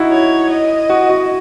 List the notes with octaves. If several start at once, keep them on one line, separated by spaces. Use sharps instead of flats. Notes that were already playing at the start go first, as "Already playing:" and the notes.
Already playing: D#4 E4 F#4
C#5
D#5
F#4
F#4